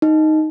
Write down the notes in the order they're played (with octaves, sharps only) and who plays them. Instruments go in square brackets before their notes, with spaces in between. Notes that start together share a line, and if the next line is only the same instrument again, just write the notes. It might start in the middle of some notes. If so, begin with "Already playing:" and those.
[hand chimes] D#4